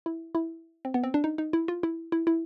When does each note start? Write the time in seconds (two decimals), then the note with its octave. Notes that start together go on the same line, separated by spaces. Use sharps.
0.06 E4
0.35 E4
0.85 C4
0.94 B3
1.03 C4
1.14 D4
1.24 D#4
1.38 D#4
1.53 E4
1.68 F4
1.83 E4
2.12 E4
2.27 E4